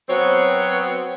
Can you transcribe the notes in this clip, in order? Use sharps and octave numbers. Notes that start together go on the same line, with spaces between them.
F#3 B3 C4 C#5